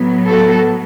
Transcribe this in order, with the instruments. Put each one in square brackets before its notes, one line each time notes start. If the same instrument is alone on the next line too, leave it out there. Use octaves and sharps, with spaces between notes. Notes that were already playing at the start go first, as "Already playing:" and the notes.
Already playing: [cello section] A2 F#3 B3
F#4 A4